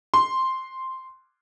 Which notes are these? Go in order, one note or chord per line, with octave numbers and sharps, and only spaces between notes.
C6